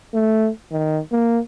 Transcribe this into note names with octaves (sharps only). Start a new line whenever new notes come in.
A3
D#3
A#3